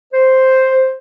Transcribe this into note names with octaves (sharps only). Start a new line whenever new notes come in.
C5